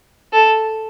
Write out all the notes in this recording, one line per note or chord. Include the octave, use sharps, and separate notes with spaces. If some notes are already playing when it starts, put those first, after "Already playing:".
A4